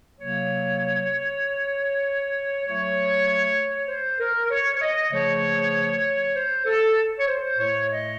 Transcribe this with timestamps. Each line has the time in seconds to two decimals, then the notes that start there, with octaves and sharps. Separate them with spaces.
0.18 C3 F#3 A#3 C#5
2.65 A2 F#3 A3 C#5
3.88 C5
4.20 A#4
4.50 C#5
4.75 C#5
4.81 D#5
5.12 C#3 F3 A3 C#5
6.36 C5
6.66 A4
7.19 C#5
7.28 C5
7.59 A2 A3 C#5
7.90 D#5